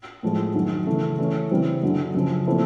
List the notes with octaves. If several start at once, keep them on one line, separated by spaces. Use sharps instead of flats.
A2 F3 G#3
F#2 D#3 F#3
C#3 E3 A3
E3 A3 C#4
C#3 E3 G3 C4
F#2 D3 F#3
F#2 C#3 F3
A#2 F3 A3 C4 E4